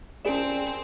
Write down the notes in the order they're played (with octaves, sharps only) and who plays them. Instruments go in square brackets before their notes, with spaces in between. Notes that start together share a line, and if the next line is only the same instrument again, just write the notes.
[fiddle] C4 [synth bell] C#4 D7 E7 [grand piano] G#4 A#4 D5